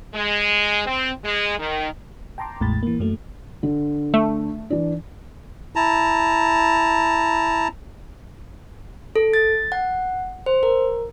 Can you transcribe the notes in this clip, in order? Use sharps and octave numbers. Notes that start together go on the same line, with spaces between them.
G#3
C4
G#3
D#3
G5 A5 A#5 C6 D6
A1 E2 A2 G#3 B5 A6
E3 A#3
F#2 F#3 A3
D3
A3
E3 D4
E4 A5 A#5
A4
A6
F#5
C5
A#4